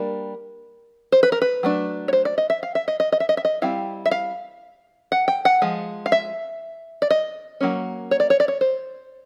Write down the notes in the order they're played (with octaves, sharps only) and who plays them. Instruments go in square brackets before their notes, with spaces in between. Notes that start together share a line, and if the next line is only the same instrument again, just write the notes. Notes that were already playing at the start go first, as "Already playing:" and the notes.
Already playing: [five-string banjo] G3 A#3 D4 A#4
C5
B4
A#4
B4
F#3 A3 D4
C#5
C5
D5
D#5
E5
F5
E5
D#5
D#5
D#5
E5
D#5
E5
D#5
G3 C4 E4 F5
E5
F5
F#5
G5
F#5
F3 G#3
F5
E5
D5
D#5
F#3 A#3 C#4
C#5
D5
C#5
D5
C#5
C5